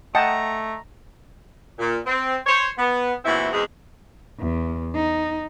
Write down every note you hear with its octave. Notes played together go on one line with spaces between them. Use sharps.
A3 D#5 F#5 G5 A5 A#5
A#2
C4
C5 C#5
B3
E2 A#2 E3 C4 E4 F#4
E2 B2 G#3 C4 G#4 B4
E2
D#4